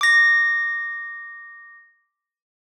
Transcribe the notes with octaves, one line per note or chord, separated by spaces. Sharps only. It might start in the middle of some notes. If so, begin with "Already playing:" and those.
D6 A#6